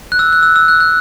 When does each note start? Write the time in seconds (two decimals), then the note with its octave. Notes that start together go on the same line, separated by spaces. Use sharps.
0.12 F#6
0.19 E6
0.33 F#6
0.43 E6
0.56 E6
0.68 F#6
0.80 F#6